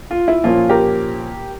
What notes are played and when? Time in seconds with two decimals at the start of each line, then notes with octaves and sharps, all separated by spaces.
0.11 F4
0.28 E4
0.44 A#2 F3 A#3 C#4 F4
0.69 G4 A#4